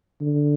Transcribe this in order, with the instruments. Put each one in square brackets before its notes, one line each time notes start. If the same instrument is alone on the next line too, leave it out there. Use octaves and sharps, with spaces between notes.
[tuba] D3